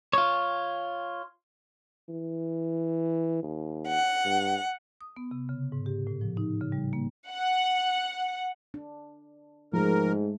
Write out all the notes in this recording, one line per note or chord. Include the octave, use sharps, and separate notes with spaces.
F4 C#5
E3
D#2
F#5
G2
D#6
B3
C3
C#3
G#2
G4
A2
F3
D#4
C#3
G3
A#3
F#5
D4
G#2 F3 G#3 A3 A#4